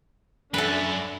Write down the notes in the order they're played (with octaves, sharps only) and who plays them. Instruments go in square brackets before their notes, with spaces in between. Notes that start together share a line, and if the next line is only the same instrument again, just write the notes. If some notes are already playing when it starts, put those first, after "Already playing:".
[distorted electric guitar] F#2 [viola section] D4 E5 B5 [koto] A4 B4